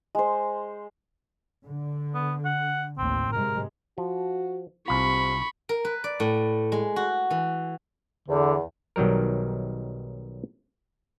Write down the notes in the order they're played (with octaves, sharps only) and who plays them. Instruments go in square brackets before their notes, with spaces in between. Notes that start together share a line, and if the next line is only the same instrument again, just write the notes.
[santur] G#3 C5
[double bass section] D3
[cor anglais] B3
F#5
[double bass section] A1 D#2 [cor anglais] C4
[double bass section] G#2 C3 G#3 [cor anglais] A#4
[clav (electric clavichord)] F3 [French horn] F#4
[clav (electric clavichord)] C2 F4 [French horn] C3 [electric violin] B5 C#6
[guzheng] A#4
B4
D5
A2
G#3
F#4
E3
[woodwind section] E2 [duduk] D3
[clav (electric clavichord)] B1 D#3 F#3 G3 A#4